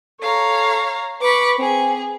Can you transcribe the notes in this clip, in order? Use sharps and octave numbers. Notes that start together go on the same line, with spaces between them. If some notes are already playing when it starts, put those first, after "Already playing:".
A4 C#5 F5 A#5
B4 B5 C#6 D6
C4 G#4